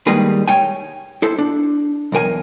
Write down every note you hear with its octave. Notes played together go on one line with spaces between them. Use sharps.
D#3 G3 G#3 A#3 G#4 B4
C#5 G5 G#5
E4 A4 C5
D4
B1 E2 A#4 G#5